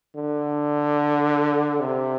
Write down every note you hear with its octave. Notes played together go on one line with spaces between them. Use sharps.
D3
C3